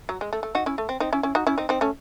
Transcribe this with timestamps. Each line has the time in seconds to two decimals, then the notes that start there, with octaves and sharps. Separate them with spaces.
0.09 F#3
0.21 G#3
0.33 A3
0.43 A3
0.55 D#4 F#4
0.66 C#4 E4
0.78 A3
0.89 C4
1.00 C4 D#4
1.13 C#4 E4
1.23 C#4 E4
1.35 D#4 F#4
1.47 C#4 E4
1.58 C4 D#4
1.69 C4 D#4
1.81 A3 C#4